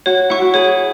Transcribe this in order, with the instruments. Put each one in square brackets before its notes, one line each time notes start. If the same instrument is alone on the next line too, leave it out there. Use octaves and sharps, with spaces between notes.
[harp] F#4 [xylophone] C#5
[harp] E4 [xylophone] F#5 C#6
[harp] F#4
[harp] G#4 [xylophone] C#5